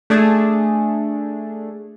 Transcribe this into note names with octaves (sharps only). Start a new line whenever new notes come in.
A3 D4 G#4